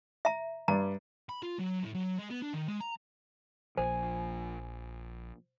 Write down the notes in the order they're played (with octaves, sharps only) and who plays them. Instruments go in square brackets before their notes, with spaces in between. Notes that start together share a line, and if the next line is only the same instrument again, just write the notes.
[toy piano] E5 A#5
[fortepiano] G2 D5 [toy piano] A#5
[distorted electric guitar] B5
F4
F#3
A2
F#3
G#3
B3
D4
D#3
G#3
A#5
[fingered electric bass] A#1 F3 [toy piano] C5 [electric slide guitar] G#5